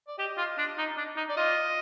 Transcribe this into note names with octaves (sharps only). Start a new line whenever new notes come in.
D5
G4 D#5
F4
D4
D#4
D4
D#4
D5
F4 D#5